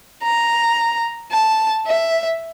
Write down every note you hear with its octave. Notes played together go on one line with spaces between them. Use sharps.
A#5
A5
E5